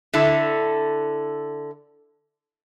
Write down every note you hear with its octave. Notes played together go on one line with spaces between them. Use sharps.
D3 E4 A4